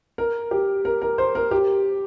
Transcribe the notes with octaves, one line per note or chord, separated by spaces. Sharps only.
A#4
G4
A#4
A#4
C5
A#4
G4